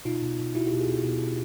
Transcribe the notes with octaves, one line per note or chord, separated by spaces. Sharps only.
B2 D#4 F4
B2
B2
B2 E4 F#4
F4 G4
B2
F#4 G#4
B2
B2
B2